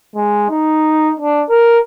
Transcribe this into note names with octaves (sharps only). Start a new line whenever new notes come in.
G#3
D#4
D4
A#4